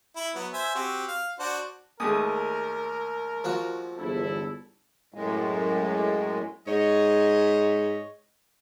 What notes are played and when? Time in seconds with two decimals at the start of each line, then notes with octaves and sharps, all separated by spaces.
0.16 E4 B5
0.35 F#3 B3
0.53 C5 E5 G#5
0.75 C4 F#4 G4
1.08 F5
1.39 D4 F#4 C5
2.00 D#2 G#3 A3 A#4 D#6
3.44 F3 F#4
3.98 G1 E2 E4 A4
5.14 F#2 A2 G#3
6.67 G#2 C#5 D#5